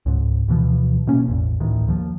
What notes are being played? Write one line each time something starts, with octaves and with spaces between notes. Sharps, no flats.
C#2 G#2
D2 B2 E3 F3
B2 A#3 C#4
A1 E2
A1 D2 A2 D#3
D#2 F3